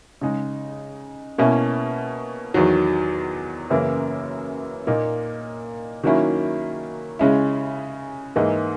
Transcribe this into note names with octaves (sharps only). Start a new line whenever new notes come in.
C#3 G#3 D#4
B2 A#3 C#4 E4
E2 D#3 F#3
F#2 C#3 E3 A#3
A#2 A#3 D#4
D#3 F#3 A#3 C#4 E4
C#3 G#3 C#4 E4
G#2 E3 A#3 D#4